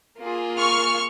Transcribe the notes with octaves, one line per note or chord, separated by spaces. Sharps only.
A#3 F4 G#4
C#6 F6